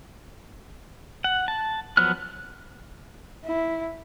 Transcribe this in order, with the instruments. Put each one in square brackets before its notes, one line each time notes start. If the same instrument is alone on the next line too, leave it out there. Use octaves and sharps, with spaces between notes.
[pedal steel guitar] F#5
A5
F3 F#3 B3 F6 F#6
[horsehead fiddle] E4